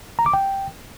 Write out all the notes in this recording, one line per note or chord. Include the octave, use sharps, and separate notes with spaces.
A#5
D6
G5